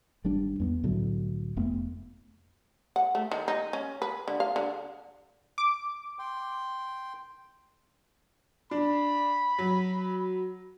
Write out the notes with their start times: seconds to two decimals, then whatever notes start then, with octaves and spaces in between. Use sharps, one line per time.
0.24 G#1 G3 D4
0.60 E2 A3 B3
0.83 C2 A2 D3 F#3
1.56 F1 F2 A3 B3
2.96 F#5
3.15 A3
3.31 D#3
3.48 D#4
3.73 C#4
4.02 B4
4.28 D3
4.40 F5
4.56 D3
5.58 D6
6.19 G5 C6
8.71 D4 B5
9.58 F#3